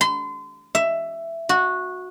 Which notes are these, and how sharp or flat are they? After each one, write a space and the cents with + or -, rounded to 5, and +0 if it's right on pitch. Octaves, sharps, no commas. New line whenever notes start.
C6 -35
E5 +10
F#4 -15